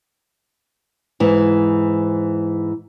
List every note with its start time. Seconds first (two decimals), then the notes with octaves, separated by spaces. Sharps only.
1.20 G#2 E3